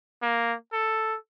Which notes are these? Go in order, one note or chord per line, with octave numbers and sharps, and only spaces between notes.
A#3
A4